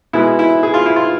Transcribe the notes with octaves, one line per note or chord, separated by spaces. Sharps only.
B2 G#3 B3 E4
E4
G#4
F4
E4
F4